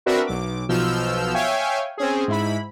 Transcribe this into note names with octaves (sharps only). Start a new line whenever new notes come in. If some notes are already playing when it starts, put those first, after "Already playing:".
C4 D4 F#4 A#4 B4 E5
B1 D6
B1 B2 F3 E6 F6 G6
C#5 E5 F5 G5 G#5
C4 C#4 G#4
G#2 E4 B5